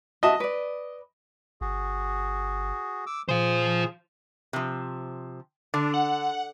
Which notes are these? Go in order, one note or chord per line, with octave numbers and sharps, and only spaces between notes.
F#4 D#5 E5 A5
B4 D5
G1 F#4 G#4
D6 E6
A#2 F4 G#4 C5
C3 F3
D3 D4
F#5